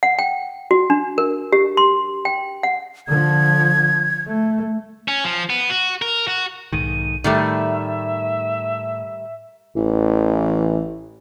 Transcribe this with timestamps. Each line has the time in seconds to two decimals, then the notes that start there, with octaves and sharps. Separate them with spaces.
0.03 F#5
0.19 G5
0.71 F#4
0.90 D4
1.18 A#4
1.53 G4
1.77 C6
2.25 G5
2.63 F#5
3.08 D3 F3 G#6
4.27 A3
5.08 C#4
5.24 F3
5.50 B3
5.70 F#4
6.02 A#4
6.28 F#4
6.73 B1 G#2 D#3 D#7
7.24 A2 D#3 G3 A3 E5
9.76 A1 E3